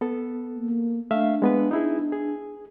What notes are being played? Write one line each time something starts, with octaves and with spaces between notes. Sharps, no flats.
B3 A4
A#3
A3 D4 E5 F5
G#3 B3 B4
D#4 E4 G#4
G#4